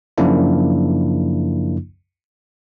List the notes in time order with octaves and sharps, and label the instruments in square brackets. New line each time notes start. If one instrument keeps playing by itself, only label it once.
[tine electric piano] F#2 C#3 F3 A#3 D4 E4